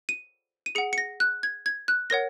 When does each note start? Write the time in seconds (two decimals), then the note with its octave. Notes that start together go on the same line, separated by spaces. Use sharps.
0.09 D#7
0.66 D#7
0.75 G#4 F#5 C#7
0.93 C#7
0.98 A#6
1.20 F#6
1.43 G#6
1.66 G#6
1.88 F#6
2.10 A#4 C#5 F#5 A#6